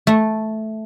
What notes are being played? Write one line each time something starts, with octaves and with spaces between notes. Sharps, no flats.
A3